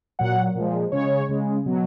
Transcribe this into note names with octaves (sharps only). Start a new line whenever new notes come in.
A#2 F#3 F#5
A#2 F3 G#3
C#3 G#3 C#5
C#3 G#3
B2 F#3